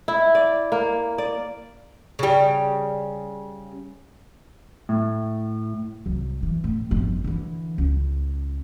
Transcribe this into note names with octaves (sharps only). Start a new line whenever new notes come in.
E4
D5
A#3
D5
C#3 G3
A2
C2 F#3
E3
A2
G1 F2
D3 E3
C#2